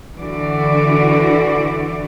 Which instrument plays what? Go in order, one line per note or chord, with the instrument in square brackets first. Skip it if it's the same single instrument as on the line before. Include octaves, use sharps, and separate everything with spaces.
[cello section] D3 E3 F#4 D5